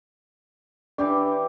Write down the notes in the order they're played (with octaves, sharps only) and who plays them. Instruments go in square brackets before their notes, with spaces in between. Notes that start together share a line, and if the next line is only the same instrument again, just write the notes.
[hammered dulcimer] E3 G4 D6 [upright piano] D4